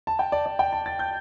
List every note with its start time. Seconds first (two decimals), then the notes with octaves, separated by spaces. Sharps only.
0.07 A5
0.19 G5
0.32 D5
0.46 D5
0.59 G5
0.73 A5
0.86 A6
0.99 G6